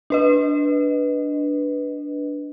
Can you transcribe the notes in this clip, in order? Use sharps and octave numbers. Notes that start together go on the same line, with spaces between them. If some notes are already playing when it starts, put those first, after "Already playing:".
D4 B4 D#5